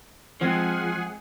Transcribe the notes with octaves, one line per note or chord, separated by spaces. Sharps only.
F3 G#3 C4 G#4 C5 F#5 G#5